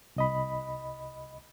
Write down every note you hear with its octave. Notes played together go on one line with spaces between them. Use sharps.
C2 D#5 B5